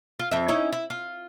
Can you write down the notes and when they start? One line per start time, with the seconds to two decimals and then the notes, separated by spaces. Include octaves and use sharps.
0.19 F4
0.31 F2 E5
0.48 C#4 D#4 E4
0.73 E4
0.90 F4